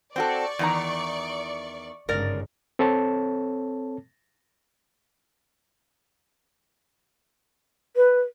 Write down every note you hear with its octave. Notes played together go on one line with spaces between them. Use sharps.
C4 F#4 A4 D5 C#6
E2 D#3 A#5
G1 G#2 C#3 A#4 D5
C4 A4 C#5 A5
B4